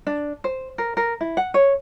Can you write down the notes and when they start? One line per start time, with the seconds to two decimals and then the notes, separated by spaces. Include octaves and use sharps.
0.07 D4
0.44 C5
0.78 A#4
0.97 A#4
1.21 E4
1.37 F#5
1.54 C#5